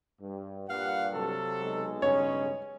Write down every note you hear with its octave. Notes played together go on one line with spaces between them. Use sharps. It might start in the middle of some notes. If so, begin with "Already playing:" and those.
G2
G2 A#2 G3 F5 F#5
C3 F#3 A4
B1 G#3
G2 C#3 C#4 C#5